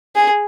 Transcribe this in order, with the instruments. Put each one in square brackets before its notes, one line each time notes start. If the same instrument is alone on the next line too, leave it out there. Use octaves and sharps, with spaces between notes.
[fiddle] G#4